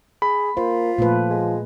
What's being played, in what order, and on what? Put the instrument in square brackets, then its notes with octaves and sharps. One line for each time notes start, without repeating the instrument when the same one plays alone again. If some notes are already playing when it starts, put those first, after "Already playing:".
[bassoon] G#4 [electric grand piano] B5
[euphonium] A#3 [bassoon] F4 [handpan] C5
[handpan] A#2 A3 B4 [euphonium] F3
[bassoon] G#3